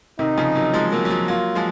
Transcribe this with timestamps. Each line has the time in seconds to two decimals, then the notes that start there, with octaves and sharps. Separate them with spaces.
0.19 C3 D#3 D#4
0.38 C#3 F3
0.55 D#3 F#3
0.73 F3 G#3
0.92 F#3 A#3
1.05 F#3
1.10 F3 G#3
1.28 F#3 A#3 F4
1.55 F3 G#3